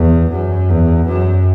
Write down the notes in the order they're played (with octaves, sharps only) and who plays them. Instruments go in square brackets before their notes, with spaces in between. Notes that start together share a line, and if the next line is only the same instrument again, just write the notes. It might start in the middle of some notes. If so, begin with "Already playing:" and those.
Already playing: [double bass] E2
F#2
E2
F#2